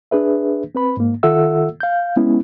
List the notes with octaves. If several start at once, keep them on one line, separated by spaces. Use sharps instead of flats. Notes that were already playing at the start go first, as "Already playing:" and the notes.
D4 G#4 B4 E5
C4 B4 B5
G#2 A#3
D#3 F4 A4 E5 F#5 E6
F5 G6
G#3 B3 C#4 E4